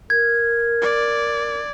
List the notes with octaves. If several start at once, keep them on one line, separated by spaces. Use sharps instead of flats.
A#4 G#6
D5